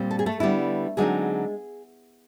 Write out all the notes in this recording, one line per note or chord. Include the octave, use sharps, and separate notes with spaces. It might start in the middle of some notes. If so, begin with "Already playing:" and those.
Already playing: A#2 G3 C4
A4
G#4
A3 A4
D3 G3 B3 E4
D3 F#3 G#3 A3 C4 D#4 G#4